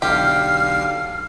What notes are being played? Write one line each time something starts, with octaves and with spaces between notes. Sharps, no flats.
B1 D3 G4 F5 F6 C7